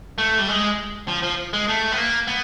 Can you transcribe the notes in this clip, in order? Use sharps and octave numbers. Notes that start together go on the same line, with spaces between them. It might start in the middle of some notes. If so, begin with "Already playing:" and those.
A3
G3
G#3
F3
F3
G#3
A3
B3
A#3
B3